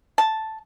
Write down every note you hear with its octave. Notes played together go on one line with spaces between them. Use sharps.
A5